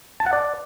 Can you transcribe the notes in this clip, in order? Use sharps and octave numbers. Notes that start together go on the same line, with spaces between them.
A5
F#5
D5